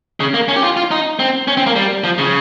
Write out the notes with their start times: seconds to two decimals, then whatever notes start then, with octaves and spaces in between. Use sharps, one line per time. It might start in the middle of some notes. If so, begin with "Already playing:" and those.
0.20 C#3
0.34 A#3
0.48 C#4
0.56 G4
0.63 F4
0.77 F4
0.91 D#4
1.19 C4
1.48 C#4
1.57 C4
1.67 A#3
1.76 G3
2.04 F3
2.18 C#3